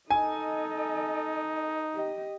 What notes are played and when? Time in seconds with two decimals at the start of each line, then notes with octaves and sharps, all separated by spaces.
0.10 D#4 A4 D#5 G#5
1.94 G4 D#5